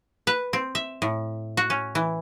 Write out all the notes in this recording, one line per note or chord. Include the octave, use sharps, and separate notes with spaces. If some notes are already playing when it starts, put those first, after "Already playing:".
B4
C4
E5
A2
F#4
C#4
E3